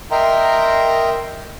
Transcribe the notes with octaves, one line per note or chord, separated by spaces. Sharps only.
A#4 D#5 E5 G5 A#5 C6